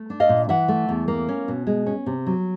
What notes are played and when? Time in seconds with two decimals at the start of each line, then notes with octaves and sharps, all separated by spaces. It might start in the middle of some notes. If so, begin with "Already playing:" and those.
Already playing: A3
0.10 D4
0.20 D#5 F5
0.29 A#2
0.49 E3 E5 F#5
0.68 A3
0.89 E2
1.08 A#3
1.29 C#4
1.48 B2
1.67 G#3
1.86 C#4
2.06 C3
2.27 F#3